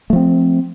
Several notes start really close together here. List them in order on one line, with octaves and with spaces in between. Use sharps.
A3 F3 C4